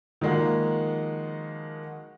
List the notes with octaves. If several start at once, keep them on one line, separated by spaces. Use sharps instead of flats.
D#3 F3 G#3 A#3 F#4